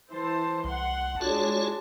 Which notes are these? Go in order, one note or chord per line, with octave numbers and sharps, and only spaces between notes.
E3 C5 A5
C2 F#5 C6
G#3 D4 F4 F#4 C#5 A5